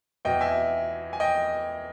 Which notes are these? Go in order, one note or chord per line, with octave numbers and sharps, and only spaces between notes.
E2 B2 D#5 G5
E5 G#5
G#5
D#5 G5